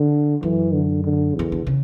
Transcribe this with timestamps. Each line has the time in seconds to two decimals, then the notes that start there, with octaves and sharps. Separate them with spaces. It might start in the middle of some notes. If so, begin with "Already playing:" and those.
Already playing: D3
0.43 F#2 E3
0.73 D3
1.04 D3
1.35 E2 E3
1.52 D3
1.67 C#3